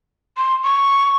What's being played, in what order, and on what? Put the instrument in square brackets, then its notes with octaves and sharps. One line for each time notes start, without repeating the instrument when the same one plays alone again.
[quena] C6
C#6